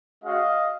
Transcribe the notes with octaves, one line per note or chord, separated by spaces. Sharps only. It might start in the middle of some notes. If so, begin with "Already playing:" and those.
G#3 C#4 F#4 D#5 F5